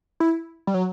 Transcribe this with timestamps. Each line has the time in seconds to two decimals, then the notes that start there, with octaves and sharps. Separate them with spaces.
0.20 E4
0.67 G3
0.74 F#3